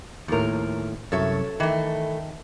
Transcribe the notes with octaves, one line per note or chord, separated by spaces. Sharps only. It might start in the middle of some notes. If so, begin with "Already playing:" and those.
D#2 A2 F3 A#4
C2 F#2 A4 C#5 E5
D#3 E3 A3